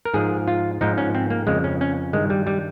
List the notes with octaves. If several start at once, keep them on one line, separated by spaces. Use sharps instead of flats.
A#4
G#2 F3 G#4
F4
G#2 F3 D#4
C#4
C4
A#3
F2 C#3 F3 G#3
C#4
C#4
G2 D#3 G#3
G3
G3